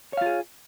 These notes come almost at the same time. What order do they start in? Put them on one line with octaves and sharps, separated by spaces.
C#5 F5 F4 G#4